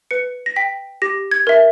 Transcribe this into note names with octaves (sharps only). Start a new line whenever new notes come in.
B4 C#7
A#6
G5 B6
G4 A#6
G#6
A#4 E5